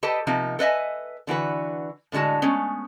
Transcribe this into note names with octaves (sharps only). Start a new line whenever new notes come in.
G4 A4 B4 D#5 G5 A5
C3 F3 A#3 D#4
A4 B4 D#5 E5 G#5
D3 E3 F#4 B4
A2 D3 G#3 F#4 A5
G#3 A3 B3 C#4